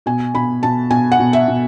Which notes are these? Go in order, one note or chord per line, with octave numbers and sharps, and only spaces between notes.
B2 G#5
B2 B5
B2 A5
B2 G#5
F#5
B2
E5
B2